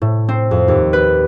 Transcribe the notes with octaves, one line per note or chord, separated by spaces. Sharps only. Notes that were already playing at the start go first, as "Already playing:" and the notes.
A2
C4
F2
D#2
B4